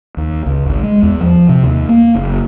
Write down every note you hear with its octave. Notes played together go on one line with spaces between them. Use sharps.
D#2
C#2
G#1
G#3
E2
F3
C3
D#2
A#3
F#1